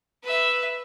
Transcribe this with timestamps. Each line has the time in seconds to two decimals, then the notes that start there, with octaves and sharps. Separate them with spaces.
0.23 B4 E5